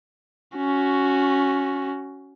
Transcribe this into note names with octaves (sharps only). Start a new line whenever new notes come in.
C#4 F#4